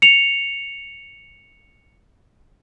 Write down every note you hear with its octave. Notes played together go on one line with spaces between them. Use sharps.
C#7 F7